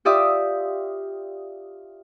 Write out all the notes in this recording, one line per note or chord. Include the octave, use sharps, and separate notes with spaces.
F4 G4 D5 E5 D#6